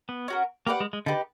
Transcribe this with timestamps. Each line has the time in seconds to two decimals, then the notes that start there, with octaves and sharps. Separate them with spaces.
0.09 B3
0.28 C#4 F#4 A#4
0.67 A#3 G4 B4 D5 F#5
0.80 G#3
0.93 G#3
1.06 D3 D#4 G4 B4